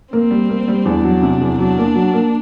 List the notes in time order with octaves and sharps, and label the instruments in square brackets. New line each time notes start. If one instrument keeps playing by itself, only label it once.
[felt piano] A#3 [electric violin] C4
[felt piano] G3
A#3
G3
[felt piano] E2 [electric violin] D4
[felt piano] F#3
C3
E2
[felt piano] F#3 [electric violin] D4
[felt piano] A#3
F#3
A#3